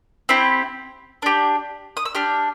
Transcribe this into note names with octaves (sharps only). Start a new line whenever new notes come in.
C4 E4 G4
D4 G4
D#6
E6
D4 G4 F6